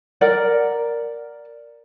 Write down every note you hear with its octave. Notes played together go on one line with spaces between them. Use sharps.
A#4 D5 F#5